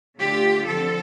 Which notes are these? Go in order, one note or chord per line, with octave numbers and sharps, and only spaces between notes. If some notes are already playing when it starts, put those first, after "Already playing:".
D3 A3 D4 F4 G4
D3 F3 C4 A4